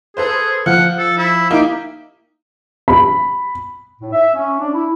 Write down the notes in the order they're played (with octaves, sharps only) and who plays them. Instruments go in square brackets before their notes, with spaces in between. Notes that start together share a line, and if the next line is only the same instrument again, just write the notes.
[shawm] G#4 [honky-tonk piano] A4 B4 C5
[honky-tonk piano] F3 F6 [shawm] F#5
[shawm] A4
E4
[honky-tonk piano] A#3 D#4 E4 [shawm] G4
[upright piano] B5
[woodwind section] A2
E5
C#4
D4
E4